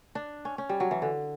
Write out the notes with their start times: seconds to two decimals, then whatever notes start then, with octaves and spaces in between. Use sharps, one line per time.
0.15 D4
0.45 C#4
0.58 C#4
0.69 G3
0.80 F#3
0.91 E3
1.02 D3